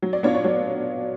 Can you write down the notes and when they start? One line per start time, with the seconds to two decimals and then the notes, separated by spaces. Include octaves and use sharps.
0.02 F#3
0.13 D5
0.23 B3 D4 F4 C#5
0.35 D5
0.44 F#3 C#5